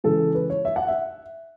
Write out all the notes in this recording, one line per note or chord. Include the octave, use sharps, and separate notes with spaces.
C#3 E3 G#3 A4
B4
C#5
E5
F#5
E5